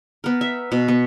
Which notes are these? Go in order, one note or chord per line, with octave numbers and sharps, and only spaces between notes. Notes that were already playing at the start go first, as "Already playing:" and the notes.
B3 A#4
E5
B2
B3